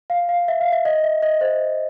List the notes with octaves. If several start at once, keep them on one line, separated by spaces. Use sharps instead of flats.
F5
F5
E5
F5
E5
D#5
E5
D#5
C5